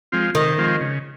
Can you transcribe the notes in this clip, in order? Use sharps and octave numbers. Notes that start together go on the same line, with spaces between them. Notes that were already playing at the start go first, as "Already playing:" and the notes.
F3 G#3 C4 F4
C3 D#3
F3 G#3 C4 F4
C#3